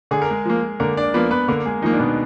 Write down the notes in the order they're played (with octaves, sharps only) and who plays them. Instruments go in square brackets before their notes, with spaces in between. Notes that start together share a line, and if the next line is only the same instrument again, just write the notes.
[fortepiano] D3 [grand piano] G#4
[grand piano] A#4
G#3 G#4
[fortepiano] F3 A#3
[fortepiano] D3 [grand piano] A#3 A#4
[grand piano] D4 D5
[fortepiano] F3 A#3 [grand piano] B3 B4
[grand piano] B3 B4
[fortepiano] D3 [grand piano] A#3 A#4
[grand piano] G#3 G#4
[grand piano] D#3 D#4 [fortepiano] F3 A#3
[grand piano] D4
B2 B3